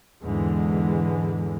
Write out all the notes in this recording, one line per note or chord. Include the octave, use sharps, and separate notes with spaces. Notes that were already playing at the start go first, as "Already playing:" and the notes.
E2 G#2 D3 E3 G#3